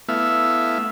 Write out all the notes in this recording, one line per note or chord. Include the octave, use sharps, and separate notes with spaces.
A3 B3 E4 E5 F5